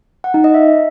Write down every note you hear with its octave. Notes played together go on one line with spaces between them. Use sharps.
F#5
D#4
D#5
E5